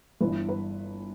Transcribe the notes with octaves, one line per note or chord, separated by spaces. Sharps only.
G1 G2 E3 B4
B4